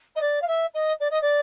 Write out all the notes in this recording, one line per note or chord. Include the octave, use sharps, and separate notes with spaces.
D#5
D5
F5
E5
D#5
D5
D#5
D5